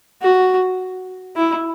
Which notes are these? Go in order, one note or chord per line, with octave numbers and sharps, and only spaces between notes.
F#4
E4